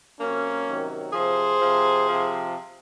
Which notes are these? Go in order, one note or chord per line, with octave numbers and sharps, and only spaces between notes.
C3 F#3 A#3 C#4
C3 D#3 F#3
C3 F3 G#4 C5
C3 F3
C3 F3